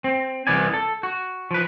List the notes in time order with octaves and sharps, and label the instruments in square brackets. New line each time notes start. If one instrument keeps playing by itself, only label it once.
[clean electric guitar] C4
C2 D#3 E3 B3 D5 G#5
A4
F#4
F3 B4